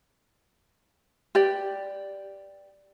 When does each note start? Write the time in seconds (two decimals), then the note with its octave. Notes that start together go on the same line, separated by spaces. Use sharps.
1.35 G4 B4 D5 G5